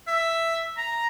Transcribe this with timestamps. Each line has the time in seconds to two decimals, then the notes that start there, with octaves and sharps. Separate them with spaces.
0.07 E5
0.77 A#5